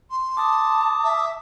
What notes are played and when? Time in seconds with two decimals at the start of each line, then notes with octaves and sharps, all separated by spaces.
0.10 C6
0.37 A5 D6 D#6
1.04 E5